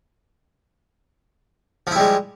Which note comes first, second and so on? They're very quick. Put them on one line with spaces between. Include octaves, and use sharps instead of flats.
F3 E4 G3 G#3